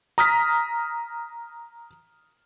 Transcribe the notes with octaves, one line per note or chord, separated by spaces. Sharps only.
A#5 D#6 F6 B6